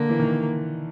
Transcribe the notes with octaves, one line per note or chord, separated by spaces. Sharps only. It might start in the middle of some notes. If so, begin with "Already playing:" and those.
Already playing: D3 A#3
E3
D#3